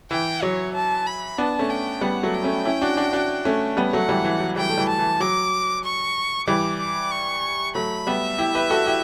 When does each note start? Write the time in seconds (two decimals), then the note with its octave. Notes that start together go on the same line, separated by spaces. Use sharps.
0.11 E3 G5
0.42 F#3 C#5
0.75 A5
1.06 B5
1.38 B3 D4 A5
1.59 A3 C#4
1.70 G5
2.01 G3 B3 F#5
2.23 F#3 A3
2.34 G5
2.44 A3 C#4
2.65 C#4 E4
2.81 D4 F#4
2.97 D4 F#4
3.13 D4 F#4
3.45 A3 C#4
3.77 G3 B3
3.93 F#3 A3 F#5
4.09 E3 G3
4.24 E3
4.41 F#3
4.56 E3 G3 G5
4.69 A3
4.78 E3 G3
4.89 A5
4.99 E3
5.20 F#3 D6
5.84 C#6
6.47 E3 G3 D6
6.80 D6
7.11 C#6
7.75 F#3 A3 B5
8.07 G3 B3 E5
8.39 E4 G4
8.54 G4 B4
8.70 F#4 A4
8.86 E4 G4